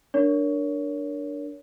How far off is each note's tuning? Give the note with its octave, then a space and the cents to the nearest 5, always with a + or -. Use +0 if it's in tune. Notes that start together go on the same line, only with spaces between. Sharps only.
D4 +0 A#4 +0 C#5 +20